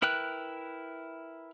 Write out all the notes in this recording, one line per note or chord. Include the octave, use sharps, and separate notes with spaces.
E4 A#4 B4 G5 F#6